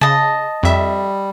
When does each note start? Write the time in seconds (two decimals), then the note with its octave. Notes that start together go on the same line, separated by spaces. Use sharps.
0.01 C#3 D#5 A5
0.63 F2 G3 E5